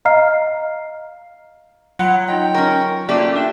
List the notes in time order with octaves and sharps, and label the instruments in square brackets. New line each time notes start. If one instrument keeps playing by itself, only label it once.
[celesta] D#5 F5 A#5 F6 C7
[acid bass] F#3 [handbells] F4 B5 [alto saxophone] F#5
[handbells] D#4 F4 D#5 [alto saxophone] G5
[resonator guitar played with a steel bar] C#4 A#4 [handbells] C#6
[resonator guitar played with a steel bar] A3 G4 [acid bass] A#3 [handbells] C#4 F4 [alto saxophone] D5
[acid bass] D4 [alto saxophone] E5